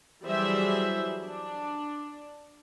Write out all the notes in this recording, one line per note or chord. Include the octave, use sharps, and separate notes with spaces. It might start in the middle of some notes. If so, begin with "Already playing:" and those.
E3 F#3 G3 G#4 C5 E5
D4